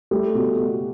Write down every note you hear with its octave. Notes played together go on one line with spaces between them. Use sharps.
G3 A3
B2
F#4